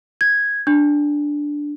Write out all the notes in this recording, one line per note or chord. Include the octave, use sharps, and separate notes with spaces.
G#6
D4